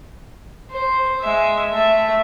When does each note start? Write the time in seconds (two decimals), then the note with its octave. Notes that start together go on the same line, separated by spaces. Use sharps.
0.72 C5
1.21 G#3 E5
1.72 A3 E5